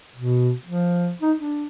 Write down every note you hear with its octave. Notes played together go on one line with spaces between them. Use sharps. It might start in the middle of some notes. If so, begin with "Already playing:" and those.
B2
F3
D#4
D4